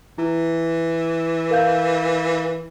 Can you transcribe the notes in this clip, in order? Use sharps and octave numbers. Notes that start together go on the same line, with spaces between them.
E3 E4
A#4 F5 G6